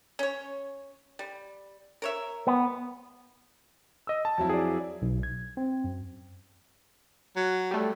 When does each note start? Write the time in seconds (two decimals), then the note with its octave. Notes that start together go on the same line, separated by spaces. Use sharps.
0.19 C#4 C#5
1.19 G3
2.02 A#4 C#5 E5
2.47 B3
4.07 D#5 E6
4.25 A5
4.38 F2 F#3 E4
4.49 G#4 D5
5.02 B1
5.23 G#6
5.57 C4
5.84 F#2
7.36 F#3
7.71 G3 A3